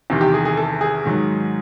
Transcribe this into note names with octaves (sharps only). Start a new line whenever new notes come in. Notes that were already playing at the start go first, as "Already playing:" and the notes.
E2 C3 D#3
G4
G#4
G#4
A4
G#4
G#2 D#3 F#3